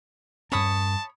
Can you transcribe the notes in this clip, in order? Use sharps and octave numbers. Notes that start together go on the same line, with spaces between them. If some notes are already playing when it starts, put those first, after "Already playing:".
G2 C#4 C#5 A5 B5 D#6